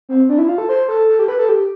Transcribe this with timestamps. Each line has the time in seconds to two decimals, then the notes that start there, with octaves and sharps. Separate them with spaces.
0.09 C4
0.29 D4
0.38 E4
0.48 F4
0.58 A4
0.69 C5
0.89 A4
1.09 A4
1.19 G4
1.28 B4
1.39 A4
1.49 G4